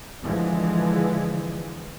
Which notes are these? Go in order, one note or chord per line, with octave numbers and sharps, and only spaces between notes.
D3 E3 F3 G#3